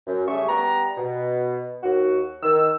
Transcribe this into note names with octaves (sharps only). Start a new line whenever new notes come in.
F#2
C#3 G3 A3 G#4 E5 C#6
G3 B3 G5 A#5
B2
D#2 F#4
D#3 E6